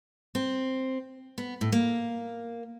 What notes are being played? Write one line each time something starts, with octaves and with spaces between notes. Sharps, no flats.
C4
B3
A2
A#3